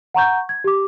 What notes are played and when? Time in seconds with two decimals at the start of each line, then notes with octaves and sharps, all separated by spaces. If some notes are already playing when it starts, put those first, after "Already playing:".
0.15 F#5 A#5 C#6 G6
0.49 G#6
0.64 G4 D6